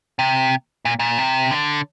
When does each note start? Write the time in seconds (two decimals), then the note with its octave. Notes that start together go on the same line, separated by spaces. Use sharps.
0.19 C3
0.85 A#2
0.99 A#2
1.18 C3
1.51 D3